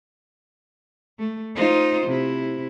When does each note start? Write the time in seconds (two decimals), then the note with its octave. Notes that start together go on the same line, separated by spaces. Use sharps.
1.19 A3
1.56 D#4 F4 C5
2.07 C3 E4